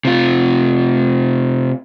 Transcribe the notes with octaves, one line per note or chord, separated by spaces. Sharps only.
C3 F4